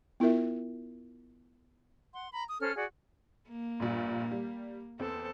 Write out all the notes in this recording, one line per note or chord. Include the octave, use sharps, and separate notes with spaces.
B3 E4 F4 A#4 E5
F#5 C6
A#5 B5
D#6
C#4 A4 C5 F6
F#4 G#4 D5
A#3
A#1 G2 A#2
G3
E2 C4 A4